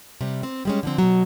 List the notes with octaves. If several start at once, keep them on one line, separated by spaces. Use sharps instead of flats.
C3 G3
C4
G3 G#3 C#4
D3 F3 C4
B2 F#3